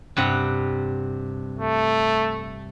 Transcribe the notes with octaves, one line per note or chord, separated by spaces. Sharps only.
G2 C3 F#5
A3